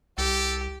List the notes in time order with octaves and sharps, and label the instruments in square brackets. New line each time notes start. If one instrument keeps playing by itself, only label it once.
[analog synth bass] C2 [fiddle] G4 [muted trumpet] A4